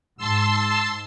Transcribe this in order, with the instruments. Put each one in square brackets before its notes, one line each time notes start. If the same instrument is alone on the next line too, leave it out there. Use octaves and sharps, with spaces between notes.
[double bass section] G#2 [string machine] A5 C6 E6